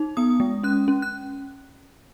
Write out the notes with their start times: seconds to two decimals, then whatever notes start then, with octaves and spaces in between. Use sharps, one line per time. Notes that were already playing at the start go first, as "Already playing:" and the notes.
Already playing: D#4
0.17 B3 D#6
0.40 G#3
0.63 C#4 F#6
0.88 C#4
1.02 F#6